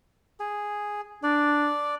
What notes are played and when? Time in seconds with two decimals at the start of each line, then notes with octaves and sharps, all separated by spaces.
0.40 G#4
1.23 D4 D5